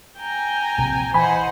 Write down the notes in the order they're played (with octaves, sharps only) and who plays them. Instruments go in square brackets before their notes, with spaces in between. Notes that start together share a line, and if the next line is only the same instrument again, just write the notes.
[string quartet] G5 G#5 A#5
[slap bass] A#1 C3 F3
[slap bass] E3 [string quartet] C5 D#5 F#5 [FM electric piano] G#5 B5